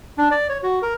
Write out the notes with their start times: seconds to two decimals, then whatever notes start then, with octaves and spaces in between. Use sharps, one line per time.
0.18 D4
0.31 D5
0.49 C#5
0.63 F#4
0.82 A#4